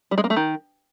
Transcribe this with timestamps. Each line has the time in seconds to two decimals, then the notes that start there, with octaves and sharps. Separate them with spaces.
0.11 G3
0.18 G#3
0.24 A#3
0.30 A3
0.36 D#3